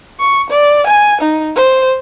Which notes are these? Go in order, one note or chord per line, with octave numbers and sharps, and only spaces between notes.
C#6
D5
G#5
D#4
C5